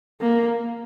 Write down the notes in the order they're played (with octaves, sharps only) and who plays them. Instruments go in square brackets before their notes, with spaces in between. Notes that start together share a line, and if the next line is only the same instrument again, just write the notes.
[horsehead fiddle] A#3